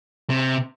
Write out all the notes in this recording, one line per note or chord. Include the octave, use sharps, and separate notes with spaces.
C3